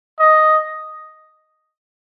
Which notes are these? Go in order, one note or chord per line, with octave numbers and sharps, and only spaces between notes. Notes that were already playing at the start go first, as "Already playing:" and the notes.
D#5